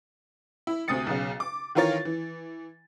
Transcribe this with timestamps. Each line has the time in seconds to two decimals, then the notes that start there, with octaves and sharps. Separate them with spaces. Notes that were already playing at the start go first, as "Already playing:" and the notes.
0.67 E4
0.88 D2 C3 D#6 A6 C#7
1.07 B1 C#3
1.40 D6
1.75 D#3 E3 F4 A#4 C#5 A6
2.05 E3